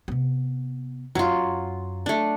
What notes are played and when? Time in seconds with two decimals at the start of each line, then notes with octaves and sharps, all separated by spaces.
0.08 C3 B3
1.15 F#2 F#3 F4
2.06 A3 D4